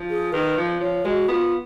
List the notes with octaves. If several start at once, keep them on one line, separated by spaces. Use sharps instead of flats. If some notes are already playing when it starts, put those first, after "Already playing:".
Already playing: F3
G#4
D#3 B4
F3
F3 C#5
G#3 F#4
B3 F4